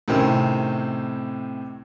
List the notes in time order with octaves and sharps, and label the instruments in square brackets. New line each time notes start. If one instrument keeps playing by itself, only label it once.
[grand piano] A2 C3 D#3 C4 C#4